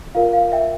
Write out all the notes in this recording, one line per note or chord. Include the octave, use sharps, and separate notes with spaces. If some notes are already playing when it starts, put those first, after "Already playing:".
F4 A#4 D5 F5
F5
E5 G5